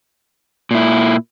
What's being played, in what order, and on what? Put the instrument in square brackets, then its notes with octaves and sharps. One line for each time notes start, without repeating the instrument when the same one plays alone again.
[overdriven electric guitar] A#2 E4